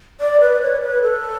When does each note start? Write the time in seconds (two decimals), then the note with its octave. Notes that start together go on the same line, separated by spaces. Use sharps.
0.21 D5
0.41 B4
0.62 C#5
0.82 B4
1.02 A4